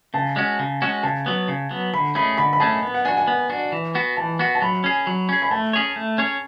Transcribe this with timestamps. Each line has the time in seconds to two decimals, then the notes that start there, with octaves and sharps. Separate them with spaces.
0.14 C#3 A5
0.36 G#3 C#4 F#4
0.59 C#3
0.82 G#3 C#4 F#4
1.03 C#3 A5
1.26 F#3 B3
1.48 C#3
1.71 F#3 B3
1.93 D3 B5
2.15 A3 C#4 G#4 B5
2.38 D3 B5
2.53 B5
2.60 A3 C#4 G#4 A5
2.83 B3
2.94 F#5
3.05 D4 F#4 G#5
3.17 G#5
3.28 B3
3.50 D4 F#4
3.72 E3
3.95 B3 F#4
4.17 E3 A5
4.39 B3 F#4
4.55 A5
4.62 F#3 B5
4.84 C#4 G#4
5.07 F#3
5.29 C#4 G#4
5.42 B5
5.51 A3 A5
5.73 C#4 G#4 C#5
5.96 A3
6.18 C#4 G#4 C#5